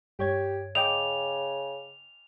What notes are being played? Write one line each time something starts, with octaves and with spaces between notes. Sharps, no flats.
G2 G4 C#5 G#6
C#3 D#5 G5 D6 F7